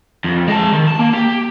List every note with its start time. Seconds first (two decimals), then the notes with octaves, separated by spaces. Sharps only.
0.24 F2
0.48 G#3 A5
0.73 D#3
0.87 A5
0.99 A#3
1.13 G4